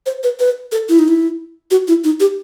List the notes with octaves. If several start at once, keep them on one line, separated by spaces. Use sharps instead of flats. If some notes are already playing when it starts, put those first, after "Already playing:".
C5
B4
B4
A4
E4
D#4
E4
F#4
E4
D#4
G4